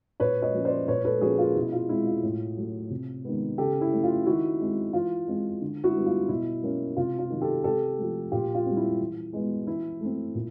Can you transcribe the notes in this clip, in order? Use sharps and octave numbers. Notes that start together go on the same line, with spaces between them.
A#2 B4 C#5
C#5 D#5
F3 A#3 C#4
C5 D5
A#2 B4 C#5
A4 B4
F3 A#3 C#4 F#4 G#4
F4
B2 E4
F4
G#3 C4 E4
F4
A2
F#3 A3
C3
D#3 G#3 B3
C#3 G4 A4
E4
F#3 A3 C#4
F4
D#3 E4 F#4
G#3 C4
E3 F4
G#3 C4
D3
E4 F#4
G3 B3
F4
B2 E4
F#3 A#3 C#4
C3 F4
F4
D#3 F#3
G4 A4
C3 G4 A4
F3 A3
A#2 F4 G4
F4
G3 C4
E4
E3
G#3 B3
E3 E4
A3 C4
A#2